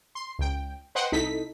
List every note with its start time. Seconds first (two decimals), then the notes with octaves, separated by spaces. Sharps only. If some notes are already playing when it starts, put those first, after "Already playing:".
0.15 C6
0.39 C#2 G5
0.95 B4 C5 D#5 F#5 G5 C6
1.12 C2 D#4 E4 A4 B6